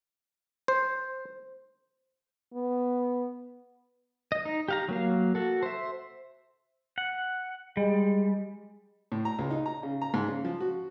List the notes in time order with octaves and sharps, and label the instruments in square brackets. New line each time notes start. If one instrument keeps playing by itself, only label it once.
[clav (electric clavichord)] C5
[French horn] B3
[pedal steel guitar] D#5
D#4
G4 F5 A#5
F#3 A#3 F5
F#4 A4
C5 E5
F#5
[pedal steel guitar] G3 [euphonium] G#3
[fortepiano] A2
A#5
C#2
D#4
A#5
C#3
A#5
G#2
C#3
F3
F#4